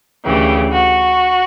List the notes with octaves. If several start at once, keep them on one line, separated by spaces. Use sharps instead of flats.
D2 C#3 E3 G4
F#4